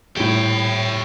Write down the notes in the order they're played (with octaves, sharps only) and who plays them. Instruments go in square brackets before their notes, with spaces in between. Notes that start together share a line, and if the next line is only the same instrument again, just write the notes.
[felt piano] D#1 A2 [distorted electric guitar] C#5 G5